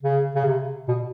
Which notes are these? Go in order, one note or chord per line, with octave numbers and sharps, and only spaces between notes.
C#3
C#3
C3
B2